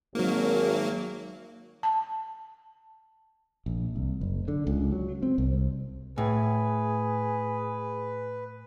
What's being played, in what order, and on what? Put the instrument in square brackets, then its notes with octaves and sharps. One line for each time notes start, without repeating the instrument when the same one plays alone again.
[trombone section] G#1 [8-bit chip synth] F#3 A#3
[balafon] A5
[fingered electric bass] A#1
C2
F#1
D3
C#2
F#3
C4
C2
[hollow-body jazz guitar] A2 [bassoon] G#4 [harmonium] B4